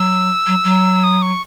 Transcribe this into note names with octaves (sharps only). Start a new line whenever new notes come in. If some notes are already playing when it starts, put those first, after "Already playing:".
Already playing: F#3 E6
F#3
F#3
D#6
C#6